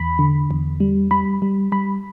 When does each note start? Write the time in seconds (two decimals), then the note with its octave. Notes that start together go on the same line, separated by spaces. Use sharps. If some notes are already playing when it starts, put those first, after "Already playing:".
Already playing: E2 B5
0.19 D3
0.51 E2
0.80 G3
1.11 G3 B5
1.42 G3
1.72 G3 B5